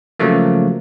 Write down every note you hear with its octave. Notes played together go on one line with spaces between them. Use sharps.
C#3 F3 F#3 A3 A#3